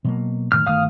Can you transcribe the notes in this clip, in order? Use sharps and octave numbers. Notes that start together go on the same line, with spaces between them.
B2 F#3 A#3
F#1 A2 D#3 F6
G1 D#3 A3 F5 D#6 F6